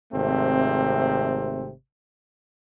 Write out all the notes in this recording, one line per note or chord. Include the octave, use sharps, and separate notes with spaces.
G#1 C3 A3 C4